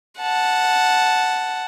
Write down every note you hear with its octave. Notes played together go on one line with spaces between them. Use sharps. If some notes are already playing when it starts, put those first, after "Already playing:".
F#5 A5